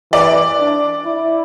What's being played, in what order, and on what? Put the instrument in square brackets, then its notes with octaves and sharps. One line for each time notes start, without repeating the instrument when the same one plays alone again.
[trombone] E3 [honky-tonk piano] D5
[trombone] D4
E4